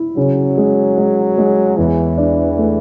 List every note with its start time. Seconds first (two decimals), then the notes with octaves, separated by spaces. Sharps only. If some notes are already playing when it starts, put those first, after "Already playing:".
Already playing: E4
0.17 C#3 F#3
0.58 G#3
0.98 G#3
1.38 G#3
1.77 E2 E3
2.18 D4
2.58 A3